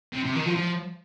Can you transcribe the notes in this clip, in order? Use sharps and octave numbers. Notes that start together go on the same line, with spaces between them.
C3
C3
D#3
F3
F3